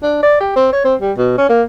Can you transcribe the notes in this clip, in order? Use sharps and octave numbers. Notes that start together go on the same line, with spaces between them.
D4
D5
G4
C4
C#5
C4
G3
B2
C#4
A#3